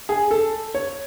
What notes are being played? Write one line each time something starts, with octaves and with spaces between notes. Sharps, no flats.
G#4
A4
C#5